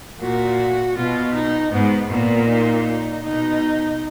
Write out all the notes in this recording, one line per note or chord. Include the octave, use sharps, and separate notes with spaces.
A#2 F#4
B2 F4
D#4
G#2 B3
A#2 B3
D#4
B2 D#4